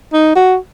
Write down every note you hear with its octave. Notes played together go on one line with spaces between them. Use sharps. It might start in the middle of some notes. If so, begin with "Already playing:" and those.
D#4
F#4